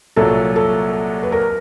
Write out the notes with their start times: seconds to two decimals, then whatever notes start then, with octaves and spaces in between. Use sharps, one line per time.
0.16 C2 A#2 F#3 A4
0.56 A4
1.23 B4
1.32 A#4